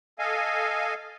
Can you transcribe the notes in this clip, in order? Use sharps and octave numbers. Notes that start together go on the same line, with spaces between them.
A4 D#5 F5 G#5